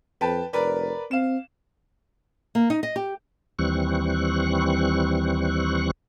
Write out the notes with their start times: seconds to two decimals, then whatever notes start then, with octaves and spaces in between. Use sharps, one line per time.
0.21 F2 B4 G5 A5
0.53 F1 A#4 B4 D5
1.11 C4 F5 E7
2.55 A#3
2.70 D#4
2.83 D#5
2.96 G4
3.59 D#2 E3 G3 C4 C#6 F#6